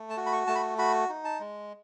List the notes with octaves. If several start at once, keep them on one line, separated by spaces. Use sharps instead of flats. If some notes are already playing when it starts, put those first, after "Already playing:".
Already playing: A3
A5
F#4
B5
C#6
A3 A5
B5
F#4 B5
D#4
A5
G#3